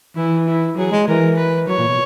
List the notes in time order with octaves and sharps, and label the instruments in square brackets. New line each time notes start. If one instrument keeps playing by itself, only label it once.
[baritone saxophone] E3 [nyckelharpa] E4
[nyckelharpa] E4
[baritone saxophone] F#3 [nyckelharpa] G#4
[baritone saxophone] G#3
[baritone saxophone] E3 [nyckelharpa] A#4
[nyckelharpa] B4
[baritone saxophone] F#3 [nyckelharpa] C#5
[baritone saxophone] A#2
B2